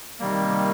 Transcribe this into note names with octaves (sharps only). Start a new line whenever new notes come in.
C3 D#3 G3 A#3